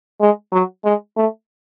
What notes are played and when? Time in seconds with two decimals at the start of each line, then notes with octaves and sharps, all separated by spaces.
0.20 G#3
0.52 F#3
0.84 G#3
1.16 A3